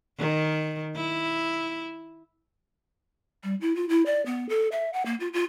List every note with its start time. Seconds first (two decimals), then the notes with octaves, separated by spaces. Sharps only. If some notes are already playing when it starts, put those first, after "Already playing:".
0.19 D#3
0.96 E4
3.44 G3
3.61 E4
3.76 F4
3.89 E4
4.06 D5
4.26 B3
4.49 A4
4.72 E5
4.93 F#5
5.06 A#3
5.20 F4
5.34 F4